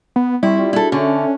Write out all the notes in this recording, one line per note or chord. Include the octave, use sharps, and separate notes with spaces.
B3
G3 C4 E4 C6 C#6
F4 G4 D5
D4 E4 F#4 G#4 A4
D3 C#4 A4 E5